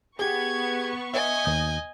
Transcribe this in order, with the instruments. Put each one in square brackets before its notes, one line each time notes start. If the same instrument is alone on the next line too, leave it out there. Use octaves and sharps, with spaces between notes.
[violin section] B3 C#6 [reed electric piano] G4 G#4 [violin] G#6
[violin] D#5 G#5 [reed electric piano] E5
[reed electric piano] D#2 D#6 G6